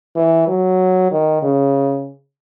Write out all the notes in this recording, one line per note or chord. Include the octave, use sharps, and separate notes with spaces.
E3
F#3
D#3
C#3